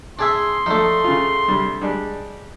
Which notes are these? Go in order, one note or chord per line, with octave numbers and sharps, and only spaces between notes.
D4 G#4 E5 C6
F3 A3 D4 D#4
C#3 F4
G2 C3 G3
G3 G#3 D4